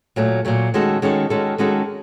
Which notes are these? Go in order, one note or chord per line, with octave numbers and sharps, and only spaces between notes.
A#2 F#3 A3
A#2 F#3 A3
D#3 G#3 C#4 F#4 A4
D#3 G#3 C#4 F#4 A4
D#3 G#3 C#4 F#4 A4
D#3 G#3 C#4 F#4 A4